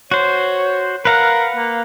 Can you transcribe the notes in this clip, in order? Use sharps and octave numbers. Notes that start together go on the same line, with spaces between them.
F#4 C5 C#5
A#4 B4 F5 F#5
A#3